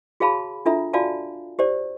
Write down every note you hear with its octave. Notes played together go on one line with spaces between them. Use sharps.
F#4 G#4 C#5 F5 A5 B5
D4 F4 A4 E5 A#5
F4 F#4 D5 F5 G#5 A5
G4 C5 D5